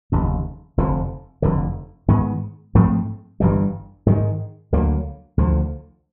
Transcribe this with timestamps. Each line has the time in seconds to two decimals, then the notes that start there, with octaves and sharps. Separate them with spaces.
0.12 F1 D#2 C#3
0.77 F1 F2 D3 F3
1.42 F1 F2 D3
2.08 G#2 D#3 G#3 B3
2.75 G#2 F3 A3 C4
3.40 G1 G2 E3 G3
4.06 G#2 D#3 G#3
4.72 D2 D3 F#3 A#3
5.37 D2 D3 F3